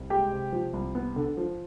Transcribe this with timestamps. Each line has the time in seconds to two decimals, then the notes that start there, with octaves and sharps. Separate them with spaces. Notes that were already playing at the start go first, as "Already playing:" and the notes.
Already playing: C2
0.10 G#3 G4 G5
0.31 C3
0.52 F3
0.73 C2
0.95 B3
1.16 D3
1.37 F3